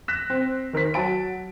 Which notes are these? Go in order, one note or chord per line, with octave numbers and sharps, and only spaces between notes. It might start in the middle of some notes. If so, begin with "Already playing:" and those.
F#6 A#6 B6 E7
C4
D#3 A#4 C5 B6
F#3 C#5 A5 D7